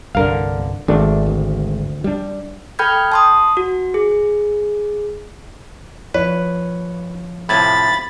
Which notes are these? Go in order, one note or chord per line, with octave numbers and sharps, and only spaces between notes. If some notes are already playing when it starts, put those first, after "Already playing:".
C2 G2 D3 A#4 F5
G#1 A3 D4
D2
G3 D4
A4 G5 B5 F6 G6 G#6
A5 C6 D#6
F#4
G#4
F3 B4 C#5
A2 C3 F3 B5 G#6 A6